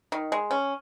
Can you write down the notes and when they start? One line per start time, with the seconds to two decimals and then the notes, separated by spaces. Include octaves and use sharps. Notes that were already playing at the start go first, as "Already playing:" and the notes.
0.12 D#3
0.32 G#3
0.51 C#4